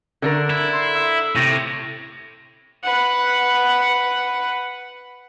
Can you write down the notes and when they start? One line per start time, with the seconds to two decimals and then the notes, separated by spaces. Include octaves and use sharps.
0.22 D3 D4 A#4
0.50 E4
0.72 C6
0.93 E5
1.35 A2 C3 A#6
2.83 B4 F#5